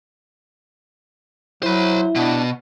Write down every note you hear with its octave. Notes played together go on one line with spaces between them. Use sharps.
F#3 E4 C5 B5
B2 D4